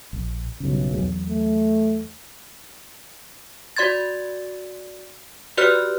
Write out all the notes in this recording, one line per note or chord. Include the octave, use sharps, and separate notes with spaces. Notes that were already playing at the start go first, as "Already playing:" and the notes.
A#1
B1 G2 C#3
E2 F#3 G#3
A3
F#4 D5 C6 G#6 A6
F#4 G4 B4 D5 F6 F#6